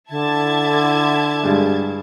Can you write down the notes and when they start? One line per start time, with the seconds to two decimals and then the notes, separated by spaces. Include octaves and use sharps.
0.10 D3 E4 A5 G#6
1.43 G2 G#3